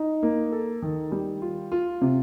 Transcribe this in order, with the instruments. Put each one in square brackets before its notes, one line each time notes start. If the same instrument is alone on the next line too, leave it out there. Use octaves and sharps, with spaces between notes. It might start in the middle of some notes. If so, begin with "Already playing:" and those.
Already playing: [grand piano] D#4
A#3
A4
D#3
G3
F4
F4
C3